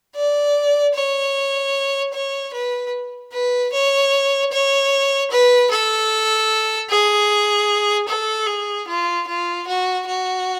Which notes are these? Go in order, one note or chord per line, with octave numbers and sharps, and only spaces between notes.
D5
C#5
C#5
B4
B4
C#5
C#5
B4
A4
G#4
A4
G#4
F4
F4
F#4
F#4